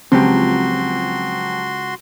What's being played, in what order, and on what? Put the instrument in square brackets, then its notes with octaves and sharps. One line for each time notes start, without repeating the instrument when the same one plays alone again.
[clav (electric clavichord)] C#2 [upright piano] F3 F#3 G4 [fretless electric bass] C4 [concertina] F#4 C6